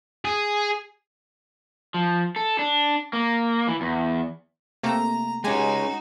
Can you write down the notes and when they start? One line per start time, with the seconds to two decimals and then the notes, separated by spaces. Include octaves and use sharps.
0.25 G#4
1.94 F3
2.36 A4
2.59 D4
3.13 A#3
3.68 E3
3.81 E2
4.83 C3 A3 A#3 A#5
5.44 G#3 C#4 D#4 F#4 G4 G#5